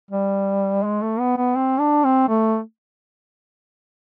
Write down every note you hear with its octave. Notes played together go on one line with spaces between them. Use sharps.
G3
G#3
A3
B3
B3
C4
D4
C4
A3